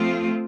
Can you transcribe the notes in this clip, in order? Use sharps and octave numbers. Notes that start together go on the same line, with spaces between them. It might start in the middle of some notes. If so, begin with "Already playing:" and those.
Already playing: F3 A3 C4 F4